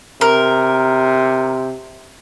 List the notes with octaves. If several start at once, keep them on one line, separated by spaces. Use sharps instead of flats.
C3 A#4